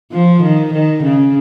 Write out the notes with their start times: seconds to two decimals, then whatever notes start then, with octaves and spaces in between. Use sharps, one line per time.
0.12 F3
0.42 D#3
0.73 D#3
1.03 C#3